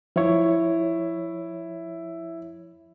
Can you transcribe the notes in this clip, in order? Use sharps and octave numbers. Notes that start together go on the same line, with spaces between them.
F3 E4 C#5